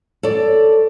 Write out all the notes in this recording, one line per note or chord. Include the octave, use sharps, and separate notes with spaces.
A4 C#5 D5